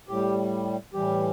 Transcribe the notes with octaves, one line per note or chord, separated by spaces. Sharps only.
A2 G3 G4
A2 E3 G3 G4